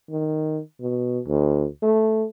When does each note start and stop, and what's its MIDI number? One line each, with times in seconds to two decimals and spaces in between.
0.10 0.60 51
0.81 1.19 47
1.27 1.66 38
1.83 2.25 57